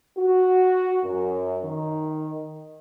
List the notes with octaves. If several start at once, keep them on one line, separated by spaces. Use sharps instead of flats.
F#4
F#2
D#3